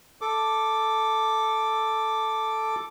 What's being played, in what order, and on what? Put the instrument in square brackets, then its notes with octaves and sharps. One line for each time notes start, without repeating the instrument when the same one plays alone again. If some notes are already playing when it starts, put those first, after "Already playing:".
[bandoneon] A4 D6